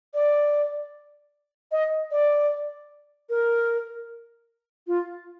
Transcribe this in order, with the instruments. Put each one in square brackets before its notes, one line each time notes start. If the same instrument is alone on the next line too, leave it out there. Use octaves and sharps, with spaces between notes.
[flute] D5
D#5
D5
A#4
F4